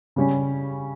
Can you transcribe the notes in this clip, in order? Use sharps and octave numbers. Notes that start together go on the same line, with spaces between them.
C#3 G3 C#4